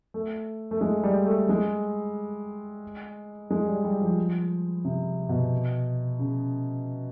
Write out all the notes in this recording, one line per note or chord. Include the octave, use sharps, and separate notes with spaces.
A3
A3
G#3
G3
A3
G#3
G#3
G3
G3
F3
C3
B2
C#3